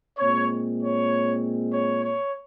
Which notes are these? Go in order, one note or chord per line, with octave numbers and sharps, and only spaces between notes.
A#2 G#3 C4 C#5
C#5
C#5
C#5